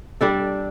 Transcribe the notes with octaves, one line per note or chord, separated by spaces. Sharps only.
G3 D4 A4